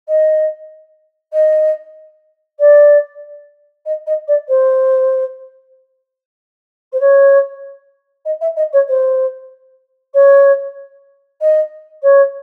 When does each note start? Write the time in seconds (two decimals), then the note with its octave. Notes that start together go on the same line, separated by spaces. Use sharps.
0.08 D#5
1.33 D#5
2.59 D5
3.86 D#5
4.07 D#5
4.28 D5
4.48 C5
6.92 C5
7.00 C#5
8.25 D#5
8.41 E5
8.56 D#5
8.73 C#5
8.88 C5
10.14 C#5
11.41 D#5
12.03 C#5